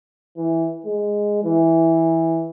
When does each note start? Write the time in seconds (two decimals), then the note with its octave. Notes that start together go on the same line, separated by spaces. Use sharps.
0.37 E3
0.86 G#3
1.44 E3